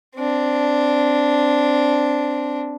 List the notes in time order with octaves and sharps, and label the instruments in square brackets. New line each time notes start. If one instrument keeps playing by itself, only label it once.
[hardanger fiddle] C4 D4